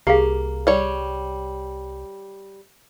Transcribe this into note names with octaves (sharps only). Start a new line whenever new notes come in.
C2 A#3 G4 G#4 F5
G3 C#5